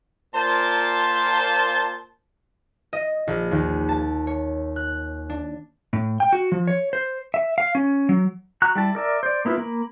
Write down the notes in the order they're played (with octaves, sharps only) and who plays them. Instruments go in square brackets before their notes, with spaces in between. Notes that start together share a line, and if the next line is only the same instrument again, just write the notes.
[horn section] A#2 C5 A5
[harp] D#5
A#1
D#2
A5
C#5
F#6
D4
[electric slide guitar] A2
G5
F#4
F3
C#5
C5
E5
F5
C#4
F#3
[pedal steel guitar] F#4 A#5 F#6
G3 E4 A5
A#4 D5 E5
C5 D5
A#3 B3 E4 F4 B4
A#3 B5